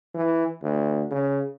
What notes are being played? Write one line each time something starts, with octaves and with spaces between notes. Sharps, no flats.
E3
D2
C#3